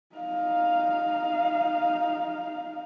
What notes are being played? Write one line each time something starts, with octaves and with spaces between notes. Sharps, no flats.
D#4 F5